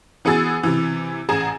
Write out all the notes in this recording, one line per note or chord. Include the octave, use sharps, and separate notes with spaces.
E3 B3 F#4 G#4 E6 A6
C3 E3
A1 G#4 G#5 A#5 G#6 E7